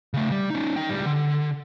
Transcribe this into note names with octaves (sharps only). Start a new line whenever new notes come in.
C#3 A3
G3
C#4 D#4
D#4 G5
C#2 G3
D3